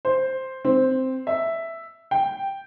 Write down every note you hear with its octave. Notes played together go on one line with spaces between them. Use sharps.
C5
C4
E5
G5